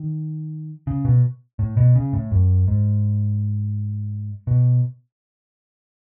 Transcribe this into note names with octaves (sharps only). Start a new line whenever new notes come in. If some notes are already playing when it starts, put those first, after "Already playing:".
Already playing: D#3
C#3
B2
A2
B2
C#3
A2
F#2
G#2
B2